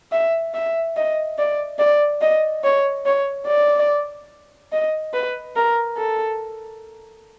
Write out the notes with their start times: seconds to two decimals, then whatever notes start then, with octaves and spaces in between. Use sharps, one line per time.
0.12 E5
0.54 E5
0.96 D#5
1.38 D5
1.79 D5
2.21 D#5
2.64 C#5
3.06 C#5
3.47 D5
4.72 D#5
5.14 B4
5.56 A#4
5.97 A4